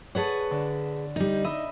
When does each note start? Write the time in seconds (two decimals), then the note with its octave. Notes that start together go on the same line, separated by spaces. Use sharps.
0.15 G#4 B4 C#5 F#5 A5
0.51 D3
1.16 G3 D#4
1.44 D#4 D#5 E5 B5